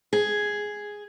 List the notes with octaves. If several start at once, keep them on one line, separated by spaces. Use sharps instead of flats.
G#4